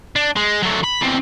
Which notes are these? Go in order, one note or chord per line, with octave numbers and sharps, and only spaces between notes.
D4
G#3
F#3 A3
B5
E2 C4